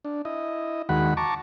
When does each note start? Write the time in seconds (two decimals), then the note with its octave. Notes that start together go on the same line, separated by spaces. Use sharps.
0.05 D4
0.25 E4 D#5
0.89 D#2 D#3 G#3 F#4 F#5 B5
1.17 A5 A#5 C#6 D6